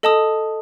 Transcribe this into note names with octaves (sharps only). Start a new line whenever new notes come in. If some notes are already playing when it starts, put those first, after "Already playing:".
A4 D#5 A5 D#6